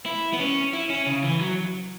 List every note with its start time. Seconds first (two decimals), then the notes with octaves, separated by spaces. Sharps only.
0.06 E4
0.33 B3
0.40 C#4
0.73 E4
0.90 C#4
1.07 C#3
1.23 E3
1.41 F#3